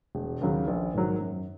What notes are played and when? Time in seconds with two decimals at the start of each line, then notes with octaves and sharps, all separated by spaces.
0.15 E1
0.41 D#2 C#3 F#3
0.67 A#1
0.94 G#2 D#3 F#3
1.20 F#2